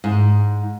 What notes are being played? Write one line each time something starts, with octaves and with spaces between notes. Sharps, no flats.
G#2